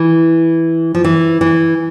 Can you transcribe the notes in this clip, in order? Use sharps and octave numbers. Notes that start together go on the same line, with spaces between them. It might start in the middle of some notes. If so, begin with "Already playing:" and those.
Already playing: E3
F3
E3
E3